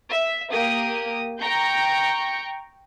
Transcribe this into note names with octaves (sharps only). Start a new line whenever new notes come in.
E5
A#3 G4 D#6
G5 A#5 C#6 G6